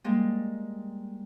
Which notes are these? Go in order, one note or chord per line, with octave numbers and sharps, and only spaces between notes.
G3 G#3 A#3